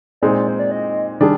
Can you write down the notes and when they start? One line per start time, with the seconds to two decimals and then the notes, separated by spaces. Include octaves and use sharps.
0.22 A#2 G#3 C4 D#4 D5
0.48 C5
0.59 D5
0.71 D#5
1.20 D#3 G3 D4 G#4 D5